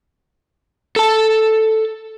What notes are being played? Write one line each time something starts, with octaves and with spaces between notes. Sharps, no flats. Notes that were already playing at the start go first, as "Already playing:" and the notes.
A4 A5